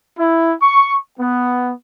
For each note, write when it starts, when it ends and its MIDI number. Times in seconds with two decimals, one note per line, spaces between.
0.17 0.53 64
0.60 0.95 85
1.18 1.71 59